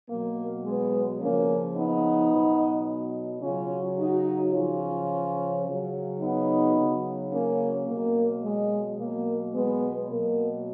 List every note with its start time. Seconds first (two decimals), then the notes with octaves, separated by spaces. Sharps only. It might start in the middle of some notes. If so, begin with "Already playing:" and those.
0.08 B2 F#3 A#3
0.64 G#3 B3
1.20 C#3 F3 A#3 C#4
1.75 B3 D#4
2.31 B2 F#3
3.41 C#3 F#3 C#4 F4
3.97 D#4 F#4
4.53 C#3 F3 C#4 F4
5.65 C#3 F#3
6.20 B3 D#4
6.76 C#3 F#3
7.31 A#3 C#4
7.86 B2 F#3 A#3
8.42 G#3
8.97 B2 F#3 A#3
9.53 G#3 B3
10.09 B2 F#3 A#3